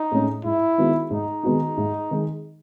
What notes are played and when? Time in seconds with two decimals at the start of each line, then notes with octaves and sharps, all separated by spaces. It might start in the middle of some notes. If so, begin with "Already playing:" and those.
Already playing: D#4
0.12 A2 G#3 C#4 G#4
0.44 G#2 E4
0.78 D#3 G#3 B3 F#4
1.10 G#2 D#4
1.43 D#3 G#3 B3 F#4
1.77 G#2
2.11 D#3 G#3